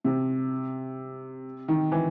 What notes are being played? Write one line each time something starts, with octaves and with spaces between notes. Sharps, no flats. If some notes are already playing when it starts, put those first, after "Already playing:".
C3
D#3
E3